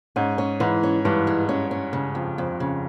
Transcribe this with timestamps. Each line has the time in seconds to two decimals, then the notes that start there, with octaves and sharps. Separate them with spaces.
0.16 G#2 C#4
0.38 C#4
0.60 G#2 E3
0.83 C#4
1.05 G2 E3
1.27 G#3
1.49 C#4
1.71 C#4
1.93 C#3
2.15 F2
2.38 F2
2.60 C#3